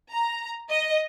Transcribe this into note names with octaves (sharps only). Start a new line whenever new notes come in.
A#5
D#5